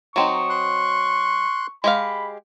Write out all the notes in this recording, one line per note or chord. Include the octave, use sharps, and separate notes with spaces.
F#3 C4 D#4 C#6
C6 F#6
G#3 G4 F5 B5